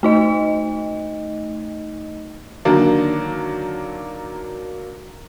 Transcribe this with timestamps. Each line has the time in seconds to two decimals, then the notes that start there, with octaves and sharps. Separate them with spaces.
0.03 A3 D#4 D#5
2.65 D3 D#3 F#3 A#3 D4